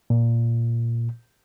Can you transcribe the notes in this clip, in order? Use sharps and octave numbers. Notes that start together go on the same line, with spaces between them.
A#2